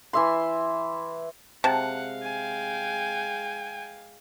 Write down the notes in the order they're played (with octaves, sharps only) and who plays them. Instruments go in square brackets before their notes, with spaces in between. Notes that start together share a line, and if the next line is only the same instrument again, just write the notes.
[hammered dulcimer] E3 E5 C6
[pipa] C3 [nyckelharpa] G#3 F5 [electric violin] F#5 [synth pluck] A5
[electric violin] G5 G#5